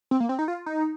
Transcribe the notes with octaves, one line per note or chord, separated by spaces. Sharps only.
C4
A#3
C4
D#4
F4
D#4